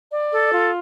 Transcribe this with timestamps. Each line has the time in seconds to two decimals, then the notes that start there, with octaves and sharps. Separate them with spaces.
0.12 D5
0.32 A4
0.53 F4